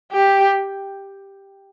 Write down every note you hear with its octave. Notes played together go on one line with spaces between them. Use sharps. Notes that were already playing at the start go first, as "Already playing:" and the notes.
G4